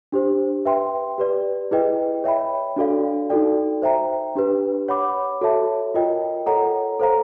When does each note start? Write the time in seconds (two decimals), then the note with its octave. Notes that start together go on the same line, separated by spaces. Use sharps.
0.12 D4 G4 C5
0.65 B4 E5 G5 C6
1.18 G4 B4 D5
1.71 E4 G#4 B4 D#5 G5
2.24 C#5 E5 G5 B5
2.76 D4 F#4 A4 D5 F5
3.30 D#4 F#4 A4 D5 G5
3.82 C5 E5 G5 A#5
4.35 D4 G4 B4
4.88 C#5 F#5 B5 D6
5.41 F#4 A4 C#5 E5 A5
5.94 F4 A#4 D#5 G5
6.46 A4 C#5 F#5 A#5
6.99 A4 C5 F5 A#5